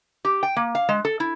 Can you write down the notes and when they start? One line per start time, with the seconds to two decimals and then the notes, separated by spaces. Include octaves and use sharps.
0.25 G4
0.43 G5
0.56 A#3
0.75 F5
0.89 G#3
1.05 A4
1.20 E4